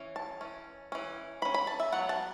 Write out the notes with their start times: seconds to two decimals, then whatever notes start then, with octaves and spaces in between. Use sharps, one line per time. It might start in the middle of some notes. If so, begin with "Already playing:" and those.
Already playing: E3 C#4
0.16 A5
0.41 E3 C#4
0.92 E3 C#4
1.42 E3 C#4 B5
1.54 B5
1.67 A5
1.80 E5
1.92 F#3 B3 F#5
2.09 A5